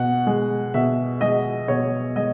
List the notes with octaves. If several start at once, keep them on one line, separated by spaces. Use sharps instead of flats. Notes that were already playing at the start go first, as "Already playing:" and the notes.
Already playing: B2 F#5
G#3
B2 E5
G#3 D#5
B2 C#5
G#3 D#5